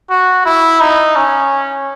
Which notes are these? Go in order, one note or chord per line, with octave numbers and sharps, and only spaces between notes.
F#4
E4
D#4
C#4